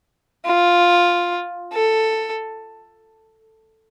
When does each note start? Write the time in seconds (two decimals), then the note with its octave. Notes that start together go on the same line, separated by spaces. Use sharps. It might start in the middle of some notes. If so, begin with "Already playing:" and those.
0.46 F4
1.73 A4